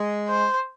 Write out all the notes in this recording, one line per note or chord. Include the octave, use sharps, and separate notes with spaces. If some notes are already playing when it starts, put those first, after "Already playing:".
Already playing: G#3
C5